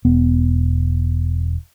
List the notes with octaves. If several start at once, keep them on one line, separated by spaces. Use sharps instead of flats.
E1 B3